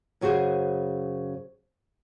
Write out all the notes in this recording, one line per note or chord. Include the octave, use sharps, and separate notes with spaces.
F#2 C#3 F#4 G#4 C5